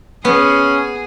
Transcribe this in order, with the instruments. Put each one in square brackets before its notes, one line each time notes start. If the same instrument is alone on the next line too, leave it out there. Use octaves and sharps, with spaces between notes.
[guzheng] B3 [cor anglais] C#4 [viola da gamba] G#4